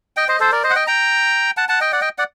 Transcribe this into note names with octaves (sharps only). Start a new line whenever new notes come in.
D#5 G5
C5 D#5
A4 C5
A#4 D5
C5 D#5
F#5
D#5 G5
G5 A#5
F#5 A5
F#5 A5
D#5 G5
D5 F#5
D#5 G5
D5 F#5